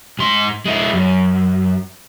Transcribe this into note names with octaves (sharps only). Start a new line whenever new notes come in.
G#2 C6
G#3 E4
F#2